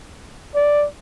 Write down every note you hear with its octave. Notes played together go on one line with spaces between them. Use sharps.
D5